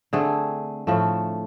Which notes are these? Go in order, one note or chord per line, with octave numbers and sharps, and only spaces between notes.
D3 A3 C4 G#4
A2 F3 A3